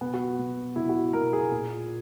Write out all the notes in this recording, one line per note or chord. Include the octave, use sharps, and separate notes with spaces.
B2 B3
F#4
B2
B2 E4
F#4
B2 A#4
G#4
A#2